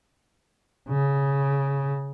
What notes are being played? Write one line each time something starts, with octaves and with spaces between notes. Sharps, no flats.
C#3